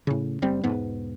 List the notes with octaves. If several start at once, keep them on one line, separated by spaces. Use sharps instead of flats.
A2 C#3
F#1 G3 C4
E1 G#2 B3